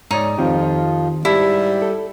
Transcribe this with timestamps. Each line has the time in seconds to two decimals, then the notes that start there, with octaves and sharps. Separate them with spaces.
0.11 G#2 D#4 C#5 D5
0.38 F2 D#3 F3 C4 F4 G4
1.25 G#2 G3 E4 G4 A5
1.82 A4